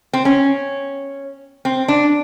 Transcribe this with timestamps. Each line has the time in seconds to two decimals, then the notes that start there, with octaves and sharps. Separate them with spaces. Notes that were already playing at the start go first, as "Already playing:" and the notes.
0.13 C4
0.25 C#4
1.65 C4
1.88 D4